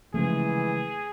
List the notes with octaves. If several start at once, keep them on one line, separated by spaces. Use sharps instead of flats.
C#3 E3 F3 G#3 A3 G#4